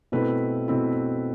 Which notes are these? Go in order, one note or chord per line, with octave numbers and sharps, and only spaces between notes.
B2 A3 C4 E4 B4
B2 A3 C4 E4